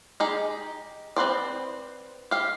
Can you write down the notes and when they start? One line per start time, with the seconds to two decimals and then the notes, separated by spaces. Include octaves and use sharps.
0.20 D#4 G4 G#4
1.16 C4 B4 C5 D5
2.31 G4 F5